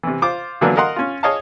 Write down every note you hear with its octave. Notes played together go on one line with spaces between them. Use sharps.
C3 E3
F4 C5 D6
D3 E3 F#3 A#3 B3 D4
A#4 D#5 F5 F#5 C6
C#4 F4
G#4 C#5 D#5 F5 A5